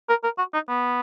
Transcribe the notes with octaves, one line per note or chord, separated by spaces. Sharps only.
A#4
A#4
F#4
D#4
B3